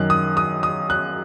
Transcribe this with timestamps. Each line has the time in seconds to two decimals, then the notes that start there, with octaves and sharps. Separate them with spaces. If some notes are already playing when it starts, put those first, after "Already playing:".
Already playing: F#2 D#3 F#6
0.10 D#6
0.37 D#6
0.63 D#6
0.90 F#6